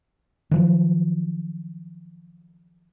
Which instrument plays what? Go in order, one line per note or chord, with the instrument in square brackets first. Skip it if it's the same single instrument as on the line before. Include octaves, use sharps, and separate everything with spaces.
[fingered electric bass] D#3 F3 F#3